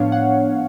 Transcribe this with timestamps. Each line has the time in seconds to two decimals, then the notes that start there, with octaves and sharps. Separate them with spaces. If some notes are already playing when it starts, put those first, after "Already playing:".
Already playing: A2 F3 B3 D4 C#5 F5
0.12 F#5